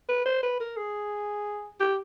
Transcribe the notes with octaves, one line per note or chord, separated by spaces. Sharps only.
B4
C5
B4
A#4
G#4
G4